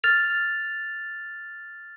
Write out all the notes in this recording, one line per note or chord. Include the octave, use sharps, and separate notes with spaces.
F6 A6 F7